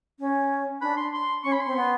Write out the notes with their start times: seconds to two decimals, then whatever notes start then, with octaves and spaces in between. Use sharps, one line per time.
0.19 C#4
0.81 D4 B5
0.97 C6
1.13 C6
1.44 C#4 C#6
1.52 B5
1.60 C6
1.66 C4
1.76 B3